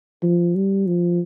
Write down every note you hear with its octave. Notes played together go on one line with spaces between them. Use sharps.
F3
G3
F3